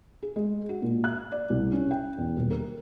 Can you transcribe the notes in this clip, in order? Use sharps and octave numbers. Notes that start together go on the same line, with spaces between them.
G#4
G#3
F#4
A#2
F#6
D5
C2
C#4
G5
E2
D#1
A#4